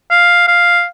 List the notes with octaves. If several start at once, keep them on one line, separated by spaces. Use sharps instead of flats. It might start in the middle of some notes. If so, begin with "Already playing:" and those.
F5
F5